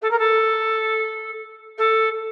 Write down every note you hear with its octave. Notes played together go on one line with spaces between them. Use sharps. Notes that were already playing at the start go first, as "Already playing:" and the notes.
A4
A#4
A4
A4